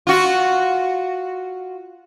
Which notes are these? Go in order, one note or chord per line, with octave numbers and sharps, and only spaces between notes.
F4 F#4